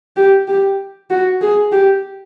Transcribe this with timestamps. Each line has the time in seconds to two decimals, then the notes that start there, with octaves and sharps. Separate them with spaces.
0.17 G4
0.48 G4
1.10 F#4
1.41 G#4
1.72 G4